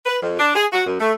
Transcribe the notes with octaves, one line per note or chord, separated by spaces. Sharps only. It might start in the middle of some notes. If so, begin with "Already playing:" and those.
B4
F2
D4
G#4
F#4
F#2
A3